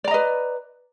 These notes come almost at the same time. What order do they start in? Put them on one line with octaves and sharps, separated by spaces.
D5 A#5 D#5 B4